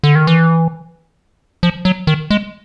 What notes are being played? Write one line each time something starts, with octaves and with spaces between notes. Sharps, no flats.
D3
D#3
E3
F3
F#3
D#3
G#3